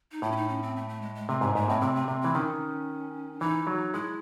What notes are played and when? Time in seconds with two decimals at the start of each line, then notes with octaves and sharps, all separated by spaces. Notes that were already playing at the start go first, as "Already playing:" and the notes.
0.12 D#4
0.22 A2 E4
0.32 C#4
0.36 D#4
0.49 C#4
0.63 C4
0.76 A3
0.89 A3
1.01 G#3
1.15 G#3
1.29 C3 A3
1.41 G#2 A3
1.55 G#2 A3
1.68 A2 C4
1.81 C3 C4
1.95 A3
2.08 C3 A3
2.21 E3 C4
2.34 D#3 C#4
3.40 E3 D#4
3.67 F#3
3.94 G#3 E4